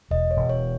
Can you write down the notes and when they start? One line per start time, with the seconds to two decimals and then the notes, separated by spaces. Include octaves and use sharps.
0.11 E1 D#5
0.31 C#5
0.37 E1
0.49 C#5